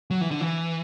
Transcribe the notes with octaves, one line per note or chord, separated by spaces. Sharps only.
F#3
E3
D3
E3